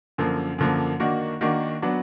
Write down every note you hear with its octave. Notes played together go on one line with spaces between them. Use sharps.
F#2 D3 F3 A#3
F#2 D3 F3 A#3
D#3 A#3 D4 F#4
D#3 A#3 D4 F#4
F#3 B3 D4